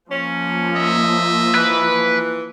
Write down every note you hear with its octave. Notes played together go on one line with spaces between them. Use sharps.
F3 A#3 C#4
D#5 E5
E3 B4